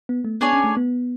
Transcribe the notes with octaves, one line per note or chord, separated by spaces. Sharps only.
B3
A3
B3 D4 G#4 C#5 G#5
C#4
A3
B3